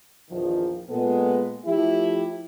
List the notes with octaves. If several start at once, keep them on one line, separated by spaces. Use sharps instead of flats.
A#1 E2 D#3 F3
A#2 G#3 B3 A4
F3 A3 E4 G4